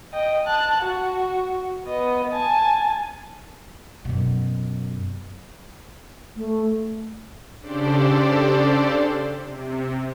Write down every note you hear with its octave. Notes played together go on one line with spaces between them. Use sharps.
D#5 G5
A5 F#6
F#4
B3 D#5
G#5 A5
F#2 B2
A3
C#3 D4 G4 A4 C5 D5
C3